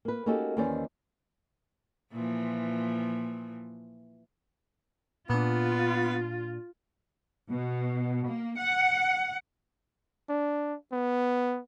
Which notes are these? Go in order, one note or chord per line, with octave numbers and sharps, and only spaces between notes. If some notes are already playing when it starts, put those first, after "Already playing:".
A#3 B4
A#3 C#4 D#4 F#4 G4 A4
D#2 D#3 E3 C#4 C5 D5
A#2 E3 F3
A#2 B3 D4 F4
B2
A#3
F#5
D4
B3